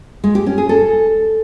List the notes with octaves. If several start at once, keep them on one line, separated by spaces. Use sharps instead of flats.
G#3
G4
C#4
G#4
A4